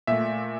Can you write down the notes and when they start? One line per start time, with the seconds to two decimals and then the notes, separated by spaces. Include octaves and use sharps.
0.07 A#2 A3 E5